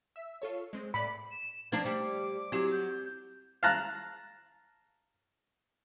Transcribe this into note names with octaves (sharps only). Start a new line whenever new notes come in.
E5
F4 A4 C#5
G#3 C4
A2 D5 B5
E7
F3 C4 D4 G#6
G3 D6
F#3 C4 E4 G4
G6
F5 A5 A#5 F#6